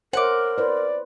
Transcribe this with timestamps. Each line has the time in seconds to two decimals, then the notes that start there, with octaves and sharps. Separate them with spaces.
0.13 A#4 C5 C#5 E5 F#5 D6
0.58 E4 B4 C5 D5